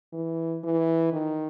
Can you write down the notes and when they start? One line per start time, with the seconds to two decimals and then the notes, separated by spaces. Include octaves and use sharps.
0.13 E3
0.64 E3
1.13 D#3